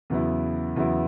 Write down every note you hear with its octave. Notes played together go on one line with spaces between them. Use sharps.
E2 C#3 F#3 B3 E4
E2 C#3 F#3 B3 E4